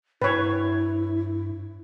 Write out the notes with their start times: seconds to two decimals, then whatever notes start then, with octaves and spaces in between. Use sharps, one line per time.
0.22 G2 E4 B4 C#5